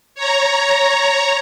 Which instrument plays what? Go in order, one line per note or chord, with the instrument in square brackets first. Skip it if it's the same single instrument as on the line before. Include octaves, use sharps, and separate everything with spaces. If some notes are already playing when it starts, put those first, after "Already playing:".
[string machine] C#5 A#5